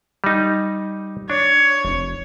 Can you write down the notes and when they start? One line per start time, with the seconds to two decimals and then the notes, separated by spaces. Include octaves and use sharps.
0.24 G3 D#4
1.30 D4 C#5
1.84 F1